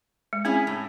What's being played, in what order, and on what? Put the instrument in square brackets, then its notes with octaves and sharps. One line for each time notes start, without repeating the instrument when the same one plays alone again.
[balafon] G#3
[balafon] C4 [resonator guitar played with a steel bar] C#4 E4 G#4
[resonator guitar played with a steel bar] A2